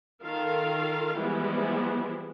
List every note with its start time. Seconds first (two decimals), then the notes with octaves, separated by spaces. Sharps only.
0.23 D#3 F4 A4 A#4 F5
1.17 E3 F3 G3 G#3 B3 E4